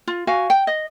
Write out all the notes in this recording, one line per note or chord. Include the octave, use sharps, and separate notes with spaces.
F4
F#4 F5 G#5
G5
D#5